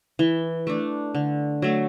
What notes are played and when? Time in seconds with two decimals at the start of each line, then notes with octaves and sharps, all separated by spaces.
0.19 E3
0.67 A3 D4
1.15 D3
1.62 F#3 A3